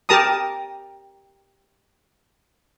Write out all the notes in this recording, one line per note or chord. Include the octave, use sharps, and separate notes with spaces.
G4 A#4 A5 A#5 D#6